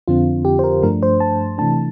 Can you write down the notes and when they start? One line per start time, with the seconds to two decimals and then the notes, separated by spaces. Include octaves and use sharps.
0.08 F2 D3 F3 C4 F4
0.45 G4
0.59 C5
0.64 A#4
0.83 G2 F3 A3 D4 A#4
1.03 C5
1.20 A5
1.58 C3 E3 A3 D4 A5